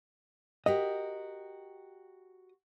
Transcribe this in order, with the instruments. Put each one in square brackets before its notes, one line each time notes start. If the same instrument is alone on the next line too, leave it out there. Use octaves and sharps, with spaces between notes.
[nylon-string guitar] F#4 G4 A#4 [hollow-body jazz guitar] D#5